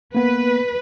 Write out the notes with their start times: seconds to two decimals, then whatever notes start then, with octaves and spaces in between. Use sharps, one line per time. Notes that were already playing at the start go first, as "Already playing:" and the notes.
0.15 A#3 B3 B4